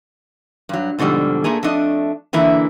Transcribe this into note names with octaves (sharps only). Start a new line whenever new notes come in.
G2 F#3
G#2 B2 D3 F3 G3
A#2 A3 A#3 G#4
F2 A3 D4 D#5
D3 E3 A#3 E4